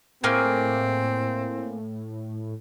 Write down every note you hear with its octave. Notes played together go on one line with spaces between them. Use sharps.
A2 A3 A#3 C4 G#4